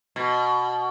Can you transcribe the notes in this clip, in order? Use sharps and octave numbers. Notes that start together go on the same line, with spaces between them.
B2